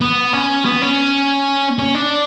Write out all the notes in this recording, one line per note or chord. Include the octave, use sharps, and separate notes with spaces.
B3
C#4
B3
C#4
C#4
D4